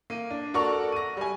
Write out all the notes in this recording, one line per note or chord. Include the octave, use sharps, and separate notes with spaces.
A#3 D#7
D4
F#4 A4 A#4 D5 C#6 F7
A#6 D#7
G3 G#5